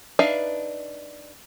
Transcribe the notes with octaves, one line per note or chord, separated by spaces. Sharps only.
D4 D#4 B4 E5 F5